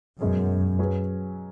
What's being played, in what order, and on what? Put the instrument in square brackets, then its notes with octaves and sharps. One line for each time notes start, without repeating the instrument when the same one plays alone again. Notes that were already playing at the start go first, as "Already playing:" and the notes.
[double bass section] F#2 [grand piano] B2 G#3 C#4 G#4
[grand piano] F#3 C#4 G#4 B4